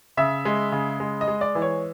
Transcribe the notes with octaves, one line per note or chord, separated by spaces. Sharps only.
C#3 E5
G#3
C#3
G#3
D#5
G#3
D5
E3
C#5